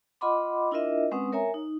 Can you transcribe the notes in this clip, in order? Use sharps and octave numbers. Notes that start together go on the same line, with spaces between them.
F4 D#5 F#5 B5 C6 D6
D4 E4 F4 A#4 D#5 E5
G#3 C4 C#4 B4 F#5 D#6
A#4 C#5 E5 G#5 A#5
D#4